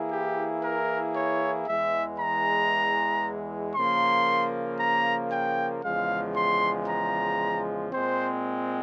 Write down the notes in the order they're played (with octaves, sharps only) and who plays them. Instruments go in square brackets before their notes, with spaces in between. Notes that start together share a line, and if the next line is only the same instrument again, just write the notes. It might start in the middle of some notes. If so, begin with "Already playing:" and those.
Already playing: [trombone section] E3 A#3 E4 G#4
[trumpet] G4
A#4
C#5
[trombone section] E2 E3 G#3 [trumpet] E5
[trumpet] A#5
[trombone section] C#3 F3 A#3 [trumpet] C6
[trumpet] A#5
G5
[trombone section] E2 C#3 F3 G#3 [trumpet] F5
[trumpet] C6
A#5
[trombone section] A#2 G#3 C4 [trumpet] C5